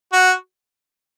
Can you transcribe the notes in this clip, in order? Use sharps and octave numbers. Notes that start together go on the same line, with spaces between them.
F#4